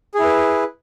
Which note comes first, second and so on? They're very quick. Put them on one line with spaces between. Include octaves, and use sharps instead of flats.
G#4 E4 B4